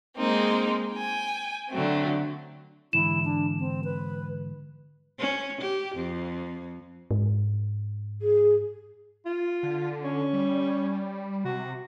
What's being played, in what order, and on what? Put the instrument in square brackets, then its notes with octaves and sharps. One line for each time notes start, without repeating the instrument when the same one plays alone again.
[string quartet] G#3 A#3 C4 D#4
G5 G#5
D3 F#3 A3 C4
[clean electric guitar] G#2 D3 E3 [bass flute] E4 [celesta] E7
[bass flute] D4
C4
B4
[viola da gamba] C#4
G4
F2
[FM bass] G#2
[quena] G#4
[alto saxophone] F4
[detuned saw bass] D3
[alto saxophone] C#4
[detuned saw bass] G3
[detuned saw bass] C3 [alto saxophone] F#4